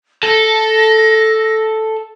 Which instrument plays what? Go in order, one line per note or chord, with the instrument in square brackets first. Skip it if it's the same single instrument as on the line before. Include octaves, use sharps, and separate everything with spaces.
[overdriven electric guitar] A4 [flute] A#6